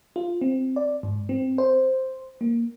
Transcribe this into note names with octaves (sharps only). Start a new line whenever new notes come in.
F4
C4
D5
G#2
C4
C5
A#3